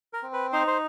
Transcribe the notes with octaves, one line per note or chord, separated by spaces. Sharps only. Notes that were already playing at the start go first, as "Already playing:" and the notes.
A#4
C4
B4
D#4 C5
C5